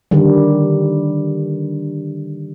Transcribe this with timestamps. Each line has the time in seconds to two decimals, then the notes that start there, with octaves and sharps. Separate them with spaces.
0.11 D3 D#3 G3